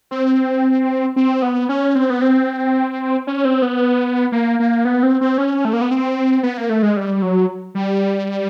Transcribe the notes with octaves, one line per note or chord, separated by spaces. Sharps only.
C4
C4
B3
C#4
C4
B3
C4
C#4
C4
B3
A#3
A#3
B3
C4
C4
C#4
A3
A#3
B3
C4
B3
A#3
A3
G#3
G3
F#3
G3